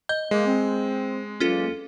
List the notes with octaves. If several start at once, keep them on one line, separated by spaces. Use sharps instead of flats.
D#5 G6
G#3 A#3
C4
E2 F#3 A#3 C#4 F4 A4